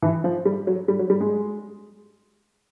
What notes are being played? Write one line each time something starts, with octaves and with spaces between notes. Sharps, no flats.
E3
F3
G3
F#3
G3
F#3
G3
G#3